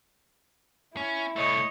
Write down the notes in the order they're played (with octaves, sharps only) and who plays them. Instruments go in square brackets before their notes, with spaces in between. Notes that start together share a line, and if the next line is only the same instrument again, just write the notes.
[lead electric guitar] C#4 [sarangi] E4
[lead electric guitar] C2 A3 [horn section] C#5 D#5